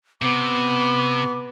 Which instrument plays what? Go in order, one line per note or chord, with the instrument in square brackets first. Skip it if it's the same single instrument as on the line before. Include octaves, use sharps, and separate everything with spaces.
[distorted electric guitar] C3 [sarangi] B3 [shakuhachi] D6